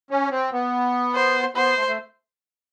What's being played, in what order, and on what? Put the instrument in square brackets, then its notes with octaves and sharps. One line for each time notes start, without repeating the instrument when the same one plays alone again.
[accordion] C#4
C4
B3
[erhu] C5
[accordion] B3 [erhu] C5
[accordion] A3
A3